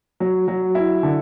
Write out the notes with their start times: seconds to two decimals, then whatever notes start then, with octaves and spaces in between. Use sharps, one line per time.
0.20 F#3
0.48 F#3
0.75 E4
1.03 D3